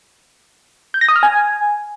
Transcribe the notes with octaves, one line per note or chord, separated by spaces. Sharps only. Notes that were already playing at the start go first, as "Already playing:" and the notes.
G6
A#6
D#6
F6
G#5